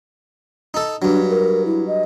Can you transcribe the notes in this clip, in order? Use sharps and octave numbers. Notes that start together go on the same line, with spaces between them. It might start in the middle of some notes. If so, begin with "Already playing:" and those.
D#4 A4
G2 F#3 D4
A#4
E4
D#5